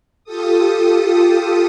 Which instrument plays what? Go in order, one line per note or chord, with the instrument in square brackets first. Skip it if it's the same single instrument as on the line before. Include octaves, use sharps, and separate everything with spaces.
[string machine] F4 G4 A4 D#6